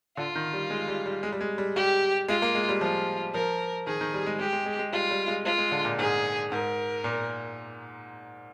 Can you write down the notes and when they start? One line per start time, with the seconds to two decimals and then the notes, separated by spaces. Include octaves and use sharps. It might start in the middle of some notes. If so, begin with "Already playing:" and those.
0.17 D3 F4
0.35 D#3
0.53 G3
0.70 G#3
0.88 G3
1.06 G3
1.23 G#3
1.32 G3
1.41 G#3
1.58 G3
1.76 G3 G4
2.28 G#3 F4
2.42 A#3
2.55 G#3
2.69 G3
2.81 F3 F4
3.34 F3 A#4
3.87 D#3 G#4
4.01 D#3
4.14 G3
4.26 G#3
4.40 G#3 G4
4.53 G#3
4.66 G#3
4.79 G#3
4.93 G3 F4
5.11 G3
5.28 G#3
5.45 G#3 F4
5.58 G#3
5.72 D3
5.85 A#2
5.99 G#2 G#4
6.51 G#2 A#4
7.04 A#2